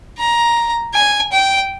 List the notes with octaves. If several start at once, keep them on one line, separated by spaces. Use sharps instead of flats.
A#5
G#5
G5